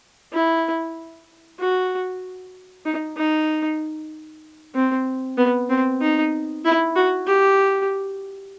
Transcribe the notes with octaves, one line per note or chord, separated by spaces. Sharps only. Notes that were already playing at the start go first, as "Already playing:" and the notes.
E4
F#4
D#4
D#4
C4
B3
C4
D#4
E4
F#4
G4